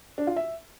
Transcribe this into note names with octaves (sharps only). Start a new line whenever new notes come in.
D4
F4
E5